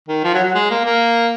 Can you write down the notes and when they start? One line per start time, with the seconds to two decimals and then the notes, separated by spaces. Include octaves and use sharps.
0.08 D#3
0.23 F3
0.34 F#3
0.44 F#3
0.55 G#3
0.70 A#3
0.85 A#3